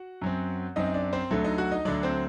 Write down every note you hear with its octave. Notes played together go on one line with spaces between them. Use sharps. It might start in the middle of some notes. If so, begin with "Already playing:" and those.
Already playing: F#4 F#5
F#2 F#3 C4
F#2 F#3 C4 D#4 D#5
D4 D5
C4 C5
D2 D3 F#3 A3 A4
D#4 D#5
F#4 F#5
D#4 D#5
D2 D3 F#3 D4 D5
C4 C5